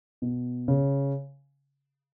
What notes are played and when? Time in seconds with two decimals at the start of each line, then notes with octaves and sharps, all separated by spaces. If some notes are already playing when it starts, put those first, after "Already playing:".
0.22 B2
0.68 C#3